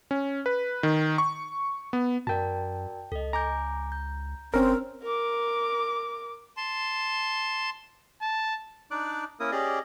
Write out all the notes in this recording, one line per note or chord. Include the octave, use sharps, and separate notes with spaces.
C#4
B4
D#3
C#6
B3
F#2 F#4 A#4 D5 G5 A5
C#2 A4 D#5
G#5 A#5 D6 G6
G6
F#1 C4 C#4 A#4 C5 E6 F6
A#4 D6
A5 C6
A5
D4 D#4 D5 D6 F#6
A#3 C#4 E4 A#4 D#6
C#4 G4 G#4 D5 D#5